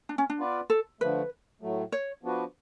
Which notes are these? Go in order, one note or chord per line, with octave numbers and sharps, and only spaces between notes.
D4
C#4
D4
B3 F4 B4 D5
A4
D3 F3 A3 B4
A2 F#3 A3
C#5
F3 B3 D4 F#4 B4